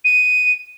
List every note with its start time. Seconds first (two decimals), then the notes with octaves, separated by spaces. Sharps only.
0.05 D#7